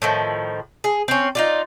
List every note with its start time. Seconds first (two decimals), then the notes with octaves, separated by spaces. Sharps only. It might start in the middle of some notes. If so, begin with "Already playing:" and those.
0.02 A2 D#3 F3
0.84 G#4
1.08 C4 C#4
1.35 D#4 F4 D5